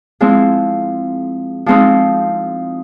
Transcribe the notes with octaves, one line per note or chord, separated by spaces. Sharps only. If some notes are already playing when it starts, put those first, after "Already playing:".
F3 G#3 C4 E4
F3 G#3 C4 D#4